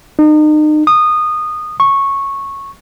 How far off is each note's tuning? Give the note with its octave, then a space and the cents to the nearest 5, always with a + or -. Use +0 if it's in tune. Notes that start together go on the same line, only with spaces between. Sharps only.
D#4 -35
D#6 -20
C#6 -10